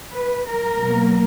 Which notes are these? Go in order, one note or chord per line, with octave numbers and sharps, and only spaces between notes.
B4
A#4
B2 F#3 A#3